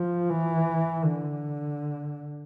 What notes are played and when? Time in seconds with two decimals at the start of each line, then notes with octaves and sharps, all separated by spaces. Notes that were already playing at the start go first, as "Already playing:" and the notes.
Already playing: F3
0.29 E3
1.04 D3